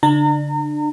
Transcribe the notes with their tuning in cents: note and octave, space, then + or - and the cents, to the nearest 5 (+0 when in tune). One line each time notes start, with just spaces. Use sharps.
D3 -35 D4 +30 A#5 -35